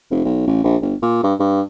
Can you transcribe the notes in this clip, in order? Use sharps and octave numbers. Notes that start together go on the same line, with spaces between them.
F1
B1
A1
A#1
G1
A#2
G2
G2